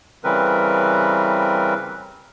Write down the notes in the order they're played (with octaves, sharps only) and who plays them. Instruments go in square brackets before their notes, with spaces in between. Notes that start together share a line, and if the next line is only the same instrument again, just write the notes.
[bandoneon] C#3 E3 G3 C4 A#4 B4